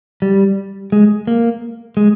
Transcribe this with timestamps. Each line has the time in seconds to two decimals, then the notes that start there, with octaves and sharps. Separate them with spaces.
0.22 G3
0.92 G#3
1.27 A#3
1.97 G#3